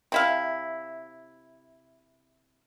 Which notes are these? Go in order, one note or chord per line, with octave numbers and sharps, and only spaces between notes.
C3 E4 F5